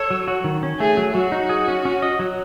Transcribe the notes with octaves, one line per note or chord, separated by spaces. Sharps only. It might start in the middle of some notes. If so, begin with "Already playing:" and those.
Already playing: A4 C#5
F#3
F#4
D#3
C#4
A3 G#4
F#3
F#3 F#4
D#4
G#4
C#4
C#4
D#5
F#3